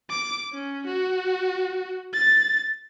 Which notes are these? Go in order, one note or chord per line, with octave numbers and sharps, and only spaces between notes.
D6
C#4
F#4
A6